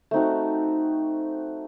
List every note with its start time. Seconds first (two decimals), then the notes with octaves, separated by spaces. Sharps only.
0.11 A3 C4 D#4 F#4